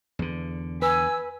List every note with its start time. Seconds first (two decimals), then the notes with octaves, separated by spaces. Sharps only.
0.19 E2 D3
0.82 B4 G#5 E6